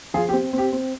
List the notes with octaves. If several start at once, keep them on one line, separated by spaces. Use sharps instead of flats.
F3 F4 G#4
G4
C4
C4 G4
C4